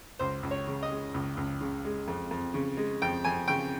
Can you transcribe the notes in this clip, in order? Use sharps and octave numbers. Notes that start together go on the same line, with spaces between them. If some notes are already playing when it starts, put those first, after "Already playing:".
C#2 C5
C#2
C#5
C#3
D#5
G#3
C#2
C#2
C#3
G#3
F2
F2
C#3
G#3
F2 G5
F2 G#5
C#3 G5